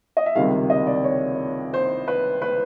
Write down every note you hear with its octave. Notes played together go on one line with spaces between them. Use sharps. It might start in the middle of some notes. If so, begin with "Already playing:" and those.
D#5
E5
C#2 C3 D#3 G3 F5
D#5
D5
C#5
C5
B4
B4